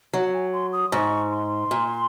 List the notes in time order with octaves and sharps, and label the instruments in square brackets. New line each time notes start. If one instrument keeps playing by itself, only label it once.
[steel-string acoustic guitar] F#3 [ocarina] F#5
[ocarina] G#5
C6
D#6
[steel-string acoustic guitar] G#2 [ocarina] C#6
[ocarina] C6
[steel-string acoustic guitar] A#2